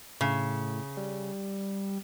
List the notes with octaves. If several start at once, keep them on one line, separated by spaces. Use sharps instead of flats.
A2 C#3
G3